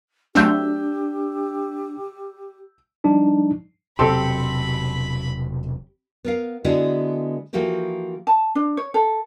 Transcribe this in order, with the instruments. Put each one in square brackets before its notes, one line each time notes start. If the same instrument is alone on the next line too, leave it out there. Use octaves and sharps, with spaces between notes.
[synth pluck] F#3 A3 C4 [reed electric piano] D4 [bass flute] G4 [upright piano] E6 G6
[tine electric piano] F3 G3 D4 D#4
[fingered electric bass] E1 C3 F#3 [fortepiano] C4 A4 C6 [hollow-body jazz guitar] G4 [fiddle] B5
[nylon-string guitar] B3 A#4 F5
D3 G#3 B3 E4 F#4 G#4
E3 F3 A#3 F#4 G4 A4
[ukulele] A5
D4
C#5
A4